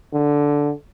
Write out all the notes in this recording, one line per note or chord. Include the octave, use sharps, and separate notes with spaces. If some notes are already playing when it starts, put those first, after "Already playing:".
D3